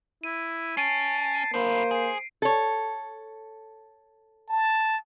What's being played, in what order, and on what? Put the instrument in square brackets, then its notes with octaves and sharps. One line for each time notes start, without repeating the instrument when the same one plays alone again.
[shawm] E4 [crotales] D#7
[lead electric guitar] C#4 [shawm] A5 [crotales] C7 D7 D#7
[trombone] A#3 [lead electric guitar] D4 E4 [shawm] C5
[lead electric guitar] G#4
[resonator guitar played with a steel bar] A4 C#5
[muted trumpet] A5